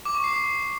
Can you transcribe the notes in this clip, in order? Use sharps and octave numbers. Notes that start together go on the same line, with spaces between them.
D6
C#6
C7
D6